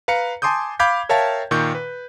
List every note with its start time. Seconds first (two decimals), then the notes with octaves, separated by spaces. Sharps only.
0.08 B4 F5 A#5 C#7
0.42 G#5 A5 C6 D6 D#6 G6
0.79 F5 B5 D6 G6 G#6 B6
1.09 A#4 C#5 E5 F5 G5 A5
1.51 A#2 D#3 C#6 G6
1.75 B4